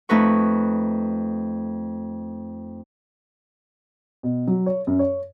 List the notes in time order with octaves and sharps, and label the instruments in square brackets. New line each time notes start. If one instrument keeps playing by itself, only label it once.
[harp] F2 A3 D#4 B4 C#6
[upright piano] B2
F#3
C#5
F#2
C#5